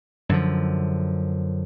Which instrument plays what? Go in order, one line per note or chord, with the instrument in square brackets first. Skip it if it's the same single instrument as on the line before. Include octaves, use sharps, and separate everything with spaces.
[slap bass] F#2 D3 F3